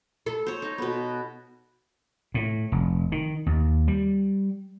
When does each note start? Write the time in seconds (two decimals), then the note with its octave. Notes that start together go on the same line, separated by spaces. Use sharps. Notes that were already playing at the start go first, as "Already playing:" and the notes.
0.26 A4
0.47 C5 C#5
0.62 D#4
0.78 B2 B3
2.34 A2
2.72 F1
3.12 D#3
3.46 D#2
3.88 G3